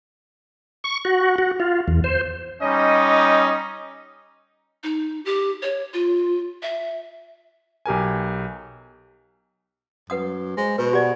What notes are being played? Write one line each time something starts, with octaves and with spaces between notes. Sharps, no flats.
C#6
F#4
F#4
F4
E2
C5
G3 C#4 D#4 D#5
D#4
G4
C#5
F4
E5
B1 G4 A#4 G#5
F#2 B4 F#5 D#6
G#3 C5
B2 B4
G4 D5 F#5